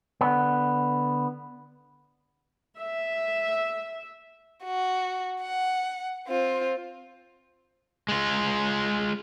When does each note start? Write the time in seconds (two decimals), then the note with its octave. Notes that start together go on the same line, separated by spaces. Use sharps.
0.21 D3 B3
2.80 E5
4.64 F#4
5.42 F#5
6.27 C4 F4
8.09 G#3 F4